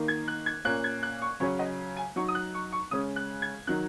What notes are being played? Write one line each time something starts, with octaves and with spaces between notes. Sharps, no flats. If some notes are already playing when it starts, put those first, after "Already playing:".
Already playing: D#3 A#3 D#4
G#6
F#6
G#6
A#2 A#3 C#4 F#6
G#6
F#6
C#6
C#3 F#3 C#4 C#5
D#5
G#5
F#3 D#4 C#6
D#6
F#6
C#6
C#6
C#3 G#3 C#4 D#6
F#6
G#6
D#3 F#3 D#4 F#6